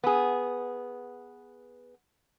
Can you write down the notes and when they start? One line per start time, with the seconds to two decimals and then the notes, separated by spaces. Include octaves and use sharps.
0.04 B3 G#4